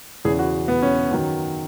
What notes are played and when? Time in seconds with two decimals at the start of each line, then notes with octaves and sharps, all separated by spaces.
0.25 E2 C#3 E3 G#4
0.39 F#4
0.68 B3
0.82 C#4
1.11 F#2 D#3 F#3